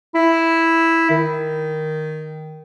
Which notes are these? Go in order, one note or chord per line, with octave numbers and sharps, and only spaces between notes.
E4
D#3